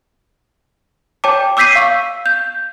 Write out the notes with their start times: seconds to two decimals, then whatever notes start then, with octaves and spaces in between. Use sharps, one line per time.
1.24 C#5 G5 A5 D6
1.57 D6 E6 G6 B6 C7 D#7
1.75 F5 C#6 E6 B6
2.26 G6